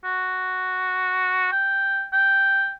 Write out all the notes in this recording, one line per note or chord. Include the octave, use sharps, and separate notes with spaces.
F#4
G5
G5